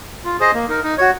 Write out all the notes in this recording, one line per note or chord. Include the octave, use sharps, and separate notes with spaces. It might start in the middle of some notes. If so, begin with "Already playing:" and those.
F4
G#4 C5 D#5
A#3
D#4 A#4
D#4
F#4 C#5